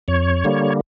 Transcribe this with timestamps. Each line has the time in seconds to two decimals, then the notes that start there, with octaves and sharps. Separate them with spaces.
0.08 F2 C#5
0.44 D3 G3 A#3